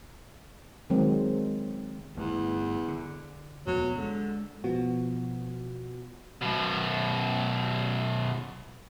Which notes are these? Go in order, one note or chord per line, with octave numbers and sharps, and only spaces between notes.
D#3 F#3 G#3 C4
G1 E2 E3 A3
D3
E1 D2 F#3 B3
D3 G#3
B2 F3 B3 F#4
F#2 B2